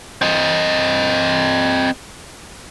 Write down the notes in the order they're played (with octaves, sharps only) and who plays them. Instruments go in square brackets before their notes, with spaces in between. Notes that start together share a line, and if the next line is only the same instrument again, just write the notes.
[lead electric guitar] C4 D#5